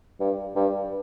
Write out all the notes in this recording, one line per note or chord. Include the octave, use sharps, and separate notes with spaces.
G2
G2